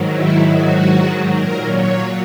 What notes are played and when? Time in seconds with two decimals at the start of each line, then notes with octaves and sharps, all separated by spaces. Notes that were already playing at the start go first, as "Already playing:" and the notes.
Already playing: G#2 D#3 F#3
0.09 E4
0.50 F#4
1.30 A#2 F#3 A#4
1.70 C#5